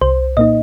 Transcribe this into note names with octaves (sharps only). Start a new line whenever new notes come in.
C2 C5
A#2 A#3 D#4 D#5